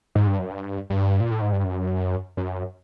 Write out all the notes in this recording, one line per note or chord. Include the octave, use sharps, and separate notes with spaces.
G#2
G2
F#2
G2
G2
A#2
A2
G#2
G2
F#2
F#2